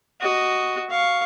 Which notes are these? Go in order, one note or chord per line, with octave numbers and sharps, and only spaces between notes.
F#4 D#5
F5 C#6